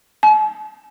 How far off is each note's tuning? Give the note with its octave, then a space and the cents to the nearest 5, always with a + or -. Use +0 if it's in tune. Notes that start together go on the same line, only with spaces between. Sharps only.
A5 -45